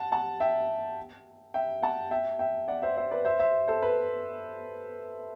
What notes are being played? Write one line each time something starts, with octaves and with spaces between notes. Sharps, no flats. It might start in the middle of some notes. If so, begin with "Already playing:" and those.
Already playing: F#5 A5
F#5 A5
E5 G5
E5 G5
F#5 A5
E5 G5
E5 G5
D5 F#5
C5 E5
C5 E5
B4 D5
C5 E5
C5 E5
A4 C5
B4